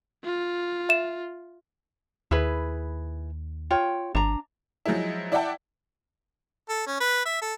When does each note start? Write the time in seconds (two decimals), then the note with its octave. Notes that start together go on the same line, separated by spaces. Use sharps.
0.24 F4
0.89 E5 E7
2.31 D#2 E4 G#4 B4
3.70 F4 C#5 G5
4.15 G#1 D4 A#5
4.85 F3 F#3 G#3 D#4 E4
5.32 E4 D5 E5 F#5 G5 A5
6.69 A4
6.87 C#4
7.00 B4
7.25 E5
7.42 A4